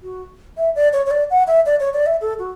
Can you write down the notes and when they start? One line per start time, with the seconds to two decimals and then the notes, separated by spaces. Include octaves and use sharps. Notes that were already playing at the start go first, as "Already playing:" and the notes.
0.03 F#4
0.57 E5
0.76 D5
0.93 C#5
1.06 C#5
1.11 D5
1.30 F#5
1.47 E5
1.66 D5
1.80 C#5
1.93 D5
2.06 E5
2.21 A4
2.39 F#4